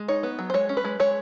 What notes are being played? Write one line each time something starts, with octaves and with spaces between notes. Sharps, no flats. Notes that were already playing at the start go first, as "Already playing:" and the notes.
Already playing: G#3
D#4 C#5
B3
F#3
C5
G#3 C#5
C#4
B4
G#3
G#3 C#5